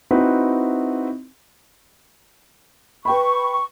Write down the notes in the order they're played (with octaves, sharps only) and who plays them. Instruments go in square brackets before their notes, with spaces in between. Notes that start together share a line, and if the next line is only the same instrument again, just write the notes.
[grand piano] C4 D#4 E4 F#4 B4 E5
[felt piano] B4 G5 B5 [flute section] C#6